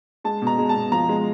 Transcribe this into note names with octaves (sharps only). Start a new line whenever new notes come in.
G#3 A5
B2
A#5
G#3
A5
B2
F3 A#5
G#3